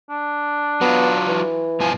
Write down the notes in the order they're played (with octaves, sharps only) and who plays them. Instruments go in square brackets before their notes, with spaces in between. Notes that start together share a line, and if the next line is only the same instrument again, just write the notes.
[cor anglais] D4
[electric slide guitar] F#3 F4 [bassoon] B3
[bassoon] E3
[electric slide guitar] G2 B2 G#5 [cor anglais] F3